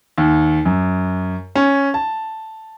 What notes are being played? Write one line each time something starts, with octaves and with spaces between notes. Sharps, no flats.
D#2
F#2
C#4
A5